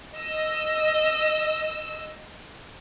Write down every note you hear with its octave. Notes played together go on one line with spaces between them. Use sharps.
D#5 E6